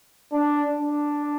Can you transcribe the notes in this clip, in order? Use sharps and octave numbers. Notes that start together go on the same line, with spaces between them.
D4
D4